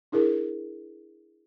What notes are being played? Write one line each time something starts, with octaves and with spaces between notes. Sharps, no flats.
D4 E4 G#4 A#4